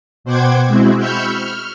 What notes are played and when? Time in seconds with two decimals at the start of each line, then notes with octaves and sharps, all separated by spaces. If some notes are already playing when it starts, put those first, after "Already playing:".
0.24 B2 C5 F#5 G5 D6 G#6
0.67 G#3 C4 E4 F#4
0.99 B5 C#6 E6 F6 G6
1.33 F6